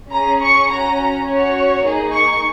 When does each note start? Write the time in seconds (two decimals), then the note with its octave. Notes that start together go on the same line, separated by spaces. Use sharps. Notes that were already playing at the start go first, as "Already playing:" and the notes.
0.11 C#4 G#4 A#5
0.41 C#6
0.69 C#4 F#4 A#5
1.26 C#4 F#4 C#5
1.85 A#3 D#4 G#4
2.13 C#6